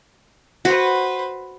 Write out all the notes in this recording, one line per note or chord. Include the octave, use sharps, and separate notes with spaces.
F#4 B4 C5